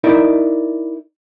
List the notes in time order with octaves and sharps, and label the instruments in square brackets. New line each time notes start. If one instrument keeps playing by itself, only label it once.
[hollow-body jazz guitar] D#4 E4 A#4 D5 E5